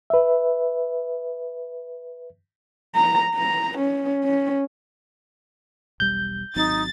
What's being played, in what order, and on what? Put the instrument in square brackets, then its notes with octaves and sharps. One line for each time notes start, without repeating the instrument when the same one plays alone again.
[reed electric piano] B4 E5
[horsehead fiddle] A#5
A#5
C#4
C#4
[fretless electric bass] E1 B1 G3 [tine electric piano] G6
[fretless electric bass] G#1 F#3 C4 [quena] D#4 [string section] A6